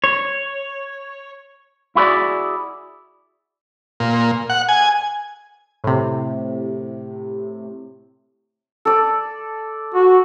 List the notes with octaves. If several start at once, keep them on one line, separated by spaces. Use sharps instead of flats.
C#5
E4 F#4 G#4 C5 D5
A#2
F#5
G#5
A2 C3
A4 D5
F#4